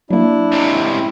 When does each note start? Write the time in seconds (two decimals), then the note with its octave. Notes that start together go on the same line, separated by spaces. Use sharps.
0.10 F#3 A#3 D4 E4
0.52 C#2 C3